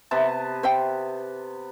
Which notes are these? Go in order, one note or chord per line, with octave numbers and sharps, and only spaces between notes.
C3 B3 A5
C5 E5 G5